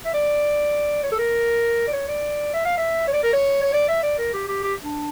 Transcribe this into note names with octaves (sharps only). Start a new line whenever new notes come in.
E5
D5
C#5
A4
A#4
D5
C#5
D5
E5
F5
E5
C#5
D5
A#4
C#5
C#5
D5
E5
D5
A#4
G4
G4
G4
D4